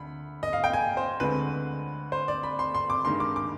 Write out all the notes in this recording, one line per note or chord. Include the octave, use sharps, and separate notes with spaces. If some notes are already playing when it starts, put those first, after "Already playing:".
Already playing: D2 B5
D#5
F5
G5
G#5
C5
D2 D3 G#3 C4 B4
C5
D5
B5
C6
C6
D6
G2 D#3 G#3 C6
D6
D6